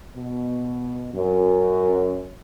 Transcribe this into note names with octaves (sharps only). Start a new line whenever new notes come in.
B2
F#2